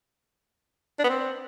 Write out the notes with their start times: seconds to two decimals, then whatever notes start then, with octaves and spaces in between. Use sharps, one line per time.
0.99 D4
1.04 B3
1.09 C4